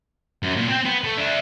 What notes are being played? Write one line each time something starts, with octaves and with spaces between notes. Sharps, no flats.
F#2
A#2
C4 G5
B3
A3
D4 E5